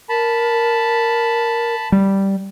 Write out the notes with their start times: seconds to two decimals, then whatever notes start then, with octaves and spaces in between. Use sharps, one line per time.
0.09 A#4 A5 B5
1.92 G3